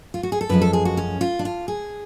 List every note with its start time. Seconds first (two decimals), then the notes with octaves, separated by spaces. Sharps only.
0.14 F4
0.23 F#4
0.32 G#4
0.41 A4
0.49 F#2 F3 G#3 B4
0.62 A4
0.73 G#4
0.85 F#4
0.97 C#4
1.21 F4
1.39 D4
1.45 F4
1.68 G#4